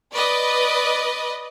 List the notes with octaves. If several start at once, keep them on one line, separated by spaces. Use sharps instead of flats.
B4 D5 D#5